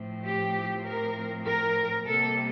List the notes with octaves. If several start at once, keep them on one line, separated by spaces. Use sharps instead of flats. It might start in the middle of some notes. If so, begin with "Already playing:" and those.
Already playing: A2 F3 C4
G4
A#4
A#4
C3 G3 A#3 A4